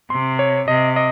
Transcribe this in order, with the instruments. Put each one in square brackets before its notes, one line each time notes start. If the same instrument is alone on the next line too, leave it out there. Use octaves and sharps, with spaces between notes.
[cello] C3 [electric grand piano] C6
[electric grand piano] C#5
[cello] C3 [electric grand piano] D#5
[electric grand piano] D#5